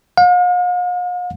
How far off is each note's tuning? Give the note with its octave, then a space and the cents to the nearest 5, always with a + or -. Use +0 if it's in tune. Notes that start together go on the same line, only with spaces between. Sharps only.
F5 +45